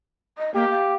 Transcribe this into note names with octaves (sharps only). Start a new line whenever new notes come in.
D#5
A#3 G4
F5